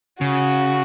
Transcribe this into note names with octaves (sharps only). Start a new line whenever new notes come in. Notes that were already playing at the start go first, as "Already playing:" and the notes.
C#3 F#4